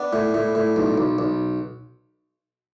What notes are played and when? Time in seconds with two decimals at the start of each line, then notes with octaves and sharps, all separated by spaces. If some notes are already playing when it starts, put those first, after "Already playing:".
Already playing: B3 D4
0.13 A2
0.34 A2
0.55 A2
0.76 B1
0.98 B1
1.18 B1